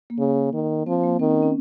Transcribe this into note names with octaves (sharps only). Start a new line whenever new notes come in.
A#3
C#3
D#3
F3 C4
A#3
D#3 C4
C#4
C#4